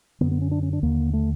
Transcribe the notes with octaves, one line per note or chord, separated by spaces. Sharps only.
F#2 D3 B3
B3
C#4
D4
C#4
D4
D#2 D3 A#3
A3